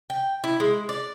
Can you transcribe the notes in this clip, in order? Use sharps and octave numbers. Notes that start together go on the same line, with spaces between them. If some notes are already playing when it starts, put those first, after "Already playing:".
G5
E4
G#3
D5